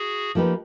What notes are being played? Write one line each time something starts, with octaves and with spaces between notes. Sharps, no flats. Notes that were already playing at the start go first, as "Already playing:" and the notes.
Already playing: F#4 G#4
F3 A#3 D#4 G4 B4